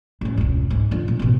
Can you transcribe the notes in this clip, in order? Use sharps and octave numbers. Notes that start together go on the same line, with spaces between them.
A1 G#2
E1 C#2
G#2
D3 F3
A#2
A1 B2